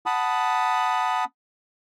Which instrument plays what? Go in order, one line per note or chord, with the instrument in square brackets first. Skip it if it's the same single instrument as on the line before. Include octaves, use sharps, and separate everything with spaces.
[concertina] F#5 A5 B5 D#6